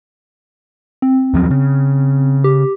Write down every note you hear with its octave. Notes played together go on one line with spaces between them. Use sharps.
C4
D#2 F3 F#3
C#3
G4